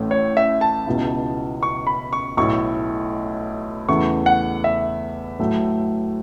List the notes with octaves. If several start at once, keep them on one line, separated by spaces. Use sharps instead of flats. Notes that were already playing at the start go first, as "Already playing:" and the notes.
Already playing: A1 A2 A3 C#4
C#5
E5
A5
C#2 B2 B3 E4
C#6
B5
C#6
B1 A2 A3 E4 C#6
E2 C#3 A3 E4 C#6
F#5
E5
A2 F#3 A3